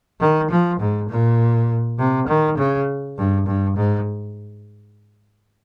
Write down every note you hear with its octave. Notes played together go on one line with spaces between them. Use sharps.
D#3
F3
G#2
A#2
C3
D#3
C#3
G2
G2
G#2